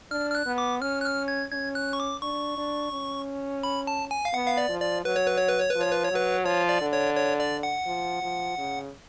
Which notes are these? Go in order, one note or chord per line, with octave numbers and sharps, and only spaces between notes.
D4 F6
F6
F#6
B3
D6
C#4 F6
F#6
F6
G#6
C#4 G#6
F#6
C#6
D6
D4 C#6
D4
C#4
B5
A5
G#5
F5
B3 F#5
F5
D5
F3
D5
F#3 B4
C#5
B4
C#5
B4
C#5
F3 B4
C#5
B4
C#5
F#3 B4
F3 C#5
D5
D3
C#5
C#5
D5
F#5
F3
F3
C#3